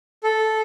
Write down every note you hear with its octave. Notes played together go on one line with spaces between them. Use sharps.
A4